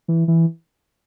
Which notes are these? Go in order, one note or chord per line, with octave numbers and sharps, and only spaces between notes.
E3
E3